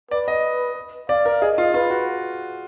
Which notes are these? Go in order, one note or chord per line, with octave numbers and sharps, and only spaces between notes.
B4 D5
D#5
D5 F5
A#4
G#4 D#5
F4
F4 B4
F#4